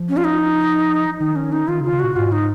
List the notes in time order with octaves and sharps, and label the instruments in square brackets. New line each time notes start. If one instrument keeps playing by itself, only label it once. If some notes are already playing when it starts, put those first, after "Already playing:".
Already playing: [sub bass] F3
[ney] C#4
F4
D#4
[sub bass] D#3 [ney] D#4
[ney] C#4
D#4
[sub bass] D#3 [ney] F4
[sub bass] C#3
[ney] F4
[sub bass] C#3
[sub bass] A#2 [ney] F#4
[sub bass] G#2 [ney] F4
[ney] D#4